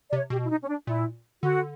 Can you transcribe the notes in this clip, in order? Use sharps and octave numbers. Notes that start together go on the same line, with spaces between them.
D5
C3
C#5
B2 G4
E4
D#4
C#4
D4
A#2 E4
D3 F#4